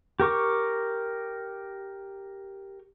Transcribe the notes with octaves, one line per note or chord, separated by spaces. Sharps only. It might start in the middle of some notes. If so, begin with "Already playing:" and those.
G4 A#4 C#6 D6